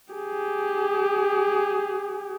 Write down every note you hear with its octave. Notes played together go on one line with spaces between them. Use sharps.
G4 G#4